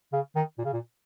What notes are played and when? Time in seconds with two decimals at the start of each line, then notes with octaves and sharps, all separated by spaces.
0.13 C#3
0.35 D#3
0.58 A#2
0.65 C#3
0.73 A#2